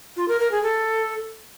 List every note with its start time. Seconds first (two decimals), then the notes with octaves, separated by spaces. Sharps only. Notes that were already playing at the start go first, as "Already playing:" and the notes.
0.17 F4
0.28 A#4
0.40 A#4
0.52 G#4
0.63 A4